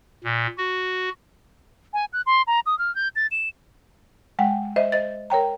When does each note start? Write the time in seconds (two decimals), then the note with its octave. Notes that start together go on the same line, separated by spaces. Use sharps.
0.24 A#2
0.57 F#4
1.93 G#5
2.13 F#6
2.26 C6
2.47 A#5
2.66 D#6
2.79 F6
2.95 G6
3.16 A6
3.31 E7
4.39 G#3 F#5 G5
4.76 C5 D#5 E5
4.92 C5 D#5 A6
5.30 A#4 C#5 G5 A#5